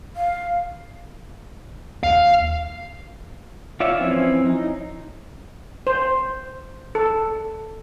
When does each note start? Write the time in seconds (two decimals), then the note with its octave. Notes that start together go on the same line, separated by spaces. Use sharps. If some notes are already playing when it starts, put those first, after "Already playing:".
0.16 F5
2.03 D#2 F5
3.80 F4 C#5 D5 E5
4.00 E3 F3 C4 C#4 E4
4.46 D#4
5.87 C5
6.95 A4